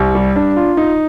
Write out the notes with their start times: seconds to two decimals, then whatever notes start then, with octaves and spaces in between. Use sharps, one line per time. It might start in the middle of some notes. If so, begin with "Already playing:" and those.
Already playing: C2
0.15 G3
0.36 D4
0.56 F4
0.77 D#4